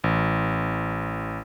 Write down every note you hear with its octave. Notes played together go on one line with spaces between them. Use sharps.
A1